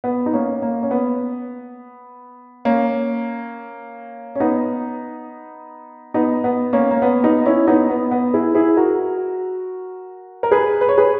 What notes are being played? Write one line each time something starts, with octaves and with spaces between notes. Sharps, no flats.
B3
D#4
A#3 C#4
A#3
C#4
B3
A#3 C#4
C#4
B3 D#4
B3 D#4
B3
A#3 C#4
A#3
B3
B3 D#4
C#4 E4
B3 D#4
B3
B3
E4 G#4
E4 G#4
F#4 A#4
A#4
G#4 B4
B4
C#5
G#4 B4